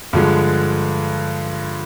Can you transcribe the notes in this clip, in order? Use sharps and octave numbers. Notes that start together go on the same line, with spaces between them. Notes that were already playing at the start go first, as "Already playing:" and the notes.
G2 D3 F3 G#3